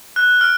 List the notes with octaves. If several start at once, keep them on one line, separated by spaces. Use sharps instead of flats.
F#6
F6